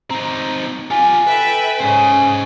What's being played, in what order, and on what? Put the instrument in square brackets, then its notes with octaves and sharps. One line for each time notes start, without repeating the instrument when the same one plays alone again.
[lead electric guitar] C4 D#4 [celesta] A#5
[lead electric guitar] F4 G4 [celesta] G#5
[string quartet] A4 E5 G5 [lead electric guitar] B4
[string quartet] G#2 C#3 [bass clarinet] C#4 [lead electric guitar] C5 D#5